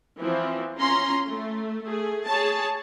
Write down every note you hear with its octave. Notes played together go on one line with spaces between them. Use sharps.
E3 F3 C4
C#4 F4 A#5 C6
A3
A3 G#4
G#4 C#5 A5